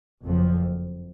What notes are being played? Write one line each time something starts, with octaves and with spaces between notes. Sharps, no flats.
F#1 F2 F3